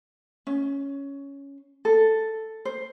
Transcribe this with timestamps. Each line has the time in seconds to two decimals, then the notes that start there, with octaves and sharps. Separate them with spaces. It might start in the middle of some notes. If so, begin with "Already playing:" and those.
0.47 C#4
1.85 A4
2.65 C5